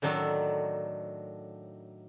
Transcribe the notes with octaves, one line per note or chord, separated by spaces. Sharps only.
A2 D#3 F#3 D4 A4